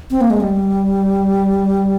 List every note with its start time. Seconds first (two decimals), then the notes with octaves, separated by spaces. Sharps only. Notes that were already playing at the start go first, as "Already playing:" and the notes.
0.11 C4
0.21 A#3
0.30 G#3
0.40 G3